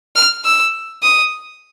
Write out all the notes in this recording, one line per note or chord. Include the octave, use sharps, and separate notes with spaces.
F6
E6
D#6